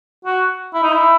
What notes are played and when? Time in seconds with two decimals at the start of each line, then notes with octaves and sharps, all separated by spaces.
0.25 F#4
0.74 E4
0.83 D#4
0.93 E4